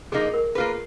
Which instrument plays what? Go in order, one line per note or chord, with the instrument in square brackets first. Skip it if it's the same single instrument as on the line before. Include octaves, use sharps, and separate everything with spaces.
[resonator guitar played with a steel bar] F3 A#3 D#4 [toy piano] G#4
[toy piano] A#4
[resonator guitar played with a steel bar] A#3 F4 B4 [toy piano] G#4